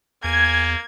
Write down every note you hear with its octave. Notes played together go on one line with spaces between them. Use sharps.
E2 A#3 G#5 G#6